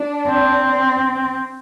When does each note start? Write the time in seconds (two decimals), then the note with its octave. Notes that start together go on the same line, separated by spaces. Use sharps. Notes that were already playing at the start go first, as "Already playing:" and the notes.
Already playing: D4
0.29 C4